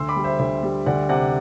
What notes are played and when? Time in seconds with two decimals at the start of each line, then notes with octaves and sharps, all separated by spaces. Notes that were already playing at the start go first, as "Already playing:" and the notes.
Already playing: D2 C6 E6
0.09 B5 D6
0.16 G3
0.24 C5 E5
0.39 D2 C5 E5
0.63 G3
0.86 D2 D5 F#5
1.09 C3 D5 F#5